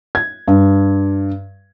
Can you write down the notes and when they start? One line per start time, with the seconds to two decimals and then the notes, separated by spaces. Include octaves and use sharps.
0.15 G#6
0.48 G2